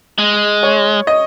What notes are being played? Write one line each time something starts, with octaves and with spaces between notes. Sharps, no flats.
G#3
C#5
D#5